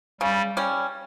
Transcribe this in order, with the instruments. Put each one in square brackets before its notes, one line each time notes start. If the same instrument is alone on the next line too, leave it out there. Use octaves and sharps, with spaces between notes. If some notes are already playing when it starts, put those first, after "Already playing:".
[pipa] C#3 [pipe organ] G3
[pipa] G3 C#4